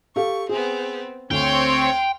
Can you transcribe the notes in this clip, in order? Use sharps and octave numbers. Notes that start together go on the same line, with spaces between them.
G4 A4 F5 C#6
B3 C4 G#4
D2 C4 C#5 F5 G5 C6